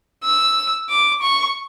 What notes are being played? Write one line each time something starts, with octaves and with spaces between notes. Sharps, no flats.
E6
D6
C#6